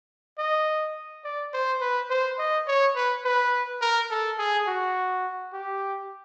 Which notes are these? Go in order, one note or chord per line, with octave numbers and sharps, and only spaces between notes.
D#5
D5
C5
B4
C5
D#5
C#5
B4
B4
A#4
A4
G#4
F#4
G4